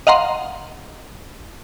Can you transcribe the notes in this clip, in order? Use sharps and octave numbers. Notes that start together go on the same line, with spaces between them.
D#5 F5 F#5 A#5 C6